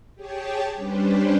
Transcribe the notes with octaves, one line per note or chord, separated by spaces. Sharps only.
G4 G#4 C#5 G5 A5
G3 C#4 D4 G4 B4 C5